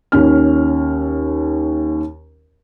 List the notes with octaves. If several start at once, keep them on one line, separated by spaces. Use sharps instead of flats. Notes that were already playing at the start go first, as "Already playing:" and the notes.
D#2 C#4 F6